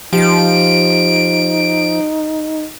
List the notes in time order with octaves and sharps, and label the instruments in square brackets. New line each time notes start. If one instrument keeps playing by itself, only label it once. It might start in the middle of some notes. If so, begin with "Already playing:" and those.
[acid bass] F3 [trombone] D#4 [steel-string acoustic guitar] G4 [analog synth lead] D7